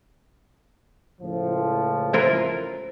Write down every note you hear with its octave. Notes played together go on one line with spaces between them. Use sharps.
C#2 A2 F3
E4 F4 A#4 C5